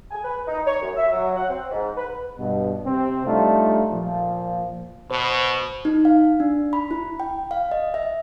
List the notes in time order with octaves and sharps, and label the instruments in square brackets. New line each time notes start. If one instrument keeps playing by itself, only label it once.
[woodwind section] G#5
B4
D#4
C#5
F#2
E5
F#3
F#5
C4
G#2
B4
[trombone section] G2 B2
C3 C4
G3 A3 D4 D#4 F4
A#2 F3
[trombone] B2 [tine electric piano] C5
[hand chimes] D#4
F5
D4
B5
E4
G5
F5
D#5
E5